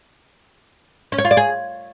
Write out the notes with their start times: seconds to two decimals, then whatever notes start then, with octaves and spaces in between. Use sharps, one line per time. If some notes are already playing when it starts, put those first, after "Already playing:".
1.12 C#4
1.18 C#5
1.25 F4
1.31 D5
1.37 G#4